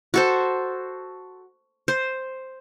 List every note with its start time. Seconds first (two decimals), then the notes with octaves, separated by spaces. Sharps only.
0.14 F#4 A4 C5
1.88 C5